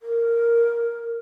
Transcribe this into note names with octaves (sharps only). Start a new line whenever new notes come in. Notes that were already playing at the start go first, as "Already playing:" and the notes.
A#4